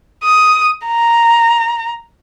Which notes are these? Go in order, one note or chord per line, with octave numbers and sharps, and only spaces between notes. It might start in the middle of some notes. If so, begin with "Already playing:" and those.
D#6
A#5